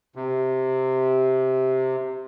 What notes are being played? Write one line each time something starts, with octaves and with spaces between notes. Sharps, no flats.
C3